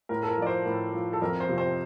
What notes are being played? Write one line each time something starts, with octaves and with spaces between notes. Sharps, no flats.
A2 A#4
A4
A#4
F3 D5
C5
A2 A#4
F3
A4
F2 A#4
C5
C3 F3
C5